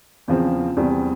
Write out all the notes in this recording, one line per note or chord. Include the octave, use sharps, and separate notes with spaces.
E2 C#3 F3 C4
E2 C3 G3 C4 G4